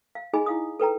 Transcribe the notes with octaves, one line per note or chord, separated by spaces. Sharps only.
F5
D#4 G#4 D#5 G#5 B5
E4 F5 D#6
A4 B4 G5 A#5